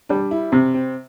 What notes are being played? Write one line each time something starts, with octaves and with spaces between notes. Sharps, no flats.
G3 D4
E4
C3 C4
C4